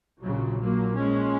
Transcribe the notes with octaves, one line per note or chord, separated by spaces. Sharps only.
A#1 A#2 C#3 F#3
F#3 A#3
G#3 C#4